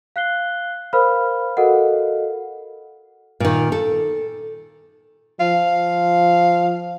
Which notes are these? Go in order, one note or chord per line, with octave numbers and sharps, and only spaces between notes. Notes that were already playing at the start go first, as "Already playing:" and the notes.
F5 F#6 C7 G7
A#4 C5 F5 B5 F6
F#4 A4 A#4 D#5 F5 F#5
A#2 D#3
A4
F3 F5